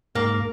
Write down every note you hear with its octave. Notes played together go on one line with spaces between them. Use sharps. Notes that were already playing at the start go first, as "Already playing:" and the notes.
G#2 A#3